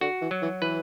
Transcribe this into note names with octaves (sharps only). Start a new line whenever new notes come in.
D3 F#4
E3
F#3
E3
E3 B4